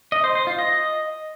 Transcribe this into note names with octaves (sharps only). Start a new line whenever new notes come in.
D#5
C5
C5
F4
D#5